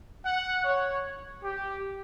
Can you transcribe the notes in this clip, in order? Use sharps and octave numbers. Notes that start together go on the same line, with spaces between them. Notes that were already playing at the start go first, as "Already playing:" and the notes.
F#5
C#5
G4